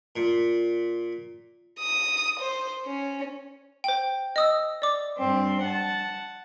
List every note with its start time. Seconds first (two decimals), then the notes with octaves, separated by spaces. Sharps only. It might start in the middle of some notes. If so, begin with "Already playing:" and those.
0.16 A#2
1.80 D#6
2.39 C5
2.86 C#4
3.84 C5 G5
4.36 D#5 D#6 E6
4.82 D5 D6
5.17 G2 C4
5.61 F#5 A5